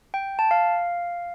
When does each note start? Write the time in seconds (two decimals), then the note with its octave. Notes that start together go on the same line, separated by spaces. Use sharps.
0.14 G5
0.39 A5
0.51 F5